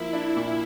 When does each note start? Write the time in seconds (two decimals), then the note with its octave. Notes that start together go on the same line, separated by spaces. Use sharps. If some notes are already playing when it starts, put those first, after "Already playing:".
Already playing: F3 A#3 E4
0.13 D4
0.37 A#2